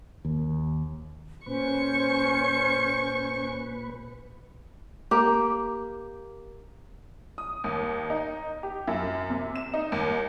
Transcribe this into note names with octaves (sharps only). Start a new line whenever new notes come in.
D#2
A#2 C#4 B4 C5 C#6
A#3 G4
D#6
D#2
D#4
G4
F#2
C3
E7
D#4
D#2